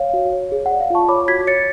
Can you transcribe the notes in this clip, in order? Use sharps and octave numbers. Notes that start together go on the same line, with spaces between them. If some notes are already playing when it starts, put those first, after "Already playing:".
Already playing: C#5 F5
F#4
C#5
G#4
F#5
D5
F5
F4 A5 C#6
C#5 B5 D6
F#4 G#6 B6
C#5 A6 C#7